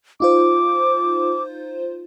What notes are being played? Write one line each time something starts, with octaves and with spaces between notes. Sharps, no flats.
D#4 F4 C5 D6